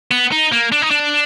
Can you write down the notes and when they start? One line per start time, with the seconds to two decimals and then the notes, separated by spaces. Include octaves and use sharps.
0.11 B3
0.32 D#4
0.52 A#3
0.72 D4
0.82 D#4
0.91 D4